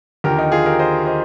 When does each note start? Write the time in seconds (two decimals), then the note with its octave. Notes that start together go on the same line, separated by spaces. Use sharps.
0.24 D#2 D3 F3 G4 A#4
0.38 D#4 G4
0.52 F4 G#4
0.66 G4 A#4
0.79 C5 D#5
1.07 C5 D#5